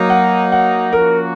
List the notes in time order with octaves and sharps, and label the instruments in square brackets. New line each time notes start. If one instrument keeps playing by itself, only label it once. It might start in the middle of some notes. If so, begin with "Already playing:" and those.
Already playing: [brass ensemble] F#3 A#3 D#4
[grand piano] F#5
F#5
[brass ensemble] F3 A#3 C#4 F#4 [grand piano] A#4